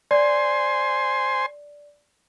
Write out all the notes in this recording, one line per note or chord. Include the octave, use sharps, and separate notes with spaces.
C5 D5 G#5 C6